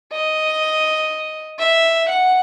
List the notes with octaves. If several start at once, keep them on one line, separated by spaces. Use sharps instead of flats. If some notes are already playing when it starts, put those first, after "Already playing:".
D#5
E5
F#5